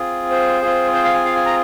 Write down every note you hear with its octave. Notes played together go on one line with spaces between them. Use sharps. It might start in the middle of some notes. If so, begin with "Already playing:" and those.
Already playing: C4 F4 G#4
C5
C4 F4 G#4
C5
F5
G#5
F5
G#5
A#5